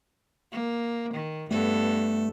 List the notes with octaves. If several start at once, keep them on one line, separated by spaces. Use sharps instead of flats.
A#3
D#3
G2 A3 B3 A4